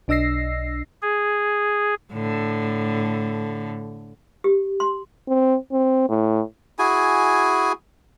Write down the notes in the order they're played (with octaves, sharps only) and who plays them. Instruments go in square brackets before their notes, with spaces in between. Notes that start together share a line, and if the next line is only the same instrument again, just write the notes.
[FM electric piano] B1 D4 D#5 E6 A#6 C7
[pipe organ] G#4
[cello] A2 D3
[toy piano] G4
C6
[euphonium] C4
C4
A2
[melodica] E4 F#4 G#4 G#5